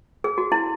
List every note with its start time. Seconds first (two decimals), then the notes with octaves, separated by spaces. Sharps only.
0.24 G#4
0.38 F#4
0.52 E4